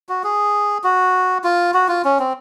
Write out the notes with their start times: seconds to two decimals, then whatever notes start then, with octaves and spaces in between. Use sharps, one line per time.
0.09 F#4
0.24 G#4
0.84 F#4
1.44 F4
1.74 F#4
1.88 F4
2.05 C#4
2.20 C4